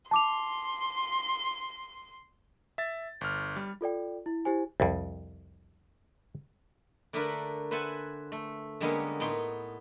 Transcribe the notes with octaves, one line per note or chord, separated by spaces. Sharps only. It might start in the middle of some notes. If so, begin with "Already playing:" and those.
A5 C6 D6 F7
E5 A6
G1 F6
G3
F4 A4 D5 G5
E4
E4 G4 C5 G#5
C2 F2
D3 A3 D4 A#4 B4
B4 C5 E5 F#5 G#5 A5
A3
D3 G3 G#3 A#3 B3 C#4
A2 B3 D#4 G5 C6